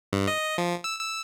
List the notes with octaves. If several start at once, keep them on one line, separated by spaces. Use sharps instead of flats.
G2
D#5
F3
E6
E6